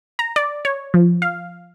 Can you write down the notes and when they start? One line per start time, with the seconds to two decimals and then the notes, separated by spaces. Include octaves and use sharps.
0.19 A#5
0.36 D5
0.65 C#5
0.94 F3
1.22 F5